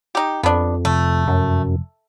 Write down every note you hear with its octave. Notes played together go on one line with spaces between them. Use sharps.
D#4 G4
F2 B3 D4
F1 A3
F#2